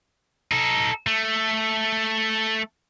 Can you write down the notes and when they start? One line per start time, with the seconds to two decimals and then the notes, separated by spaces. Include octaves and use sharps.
0.52 D#4 A4
1.07 A3